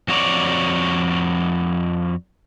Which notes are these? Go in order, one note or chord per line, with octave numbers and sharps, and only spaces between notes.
F2 F#4 C#5 D5